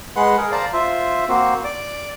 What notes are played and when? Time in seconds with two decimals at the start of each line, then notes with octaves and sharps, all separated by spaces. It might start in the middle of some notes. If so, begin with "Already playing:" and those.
0.16 G#3 B4 F#5 C6
0.38 G#4 A#4
0.52 C5 D5 F5 A5 A#5
0.73 F4 C5 E5
1.29 A#3 C4 F#4 C5
1.64 D5 D6